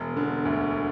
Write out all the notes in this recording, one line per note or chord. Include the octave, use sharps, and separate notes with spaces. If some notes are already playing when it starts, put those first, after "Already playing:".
Already playing: E1
D3
D2